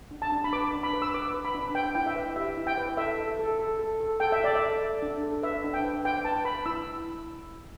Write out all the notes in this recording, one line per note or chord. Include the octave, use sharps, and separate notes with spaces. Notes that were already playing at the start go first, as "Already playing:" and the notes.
D4
A5
D4
B5
B4 D6
D4
B5
B4
E6
B4 D6
B4
B5
D4
B4 G5
E4 G5
E5
B4
G4 E5
E4
G5
B4
A4 E5
A4
A4
A4
A4
A4
A4 G5
E5
A4 D5
E5
A4
A4
D4
A4
B4 E5
D4
G5
B4
B4 G5
B4 A5
B4 B5
E4 E6